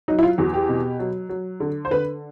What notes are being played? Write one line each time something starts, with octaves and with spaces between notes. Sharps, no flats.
F#3 D#4
E4
F4
E2 F#4
G4
B2
F#3
F#3
D3
C5
D3 B4